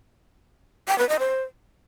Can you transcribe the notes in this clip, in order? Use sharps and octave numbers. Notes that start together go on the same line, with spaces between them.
G5
B4
D#5
C5